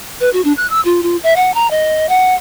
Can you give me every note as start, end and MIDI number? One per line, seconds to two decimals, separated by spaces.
0.21 0.30 71
0.33 0.41 66
0.45 0.53 62
0.57 0.67 90
0.70 0.81 88
0.85 1.01 65
1.03 1.17 65
1.23 1.34 76
1.36 1.54 78
1.54 1.70 82
1.71 2.07 75
2.09 2.35 78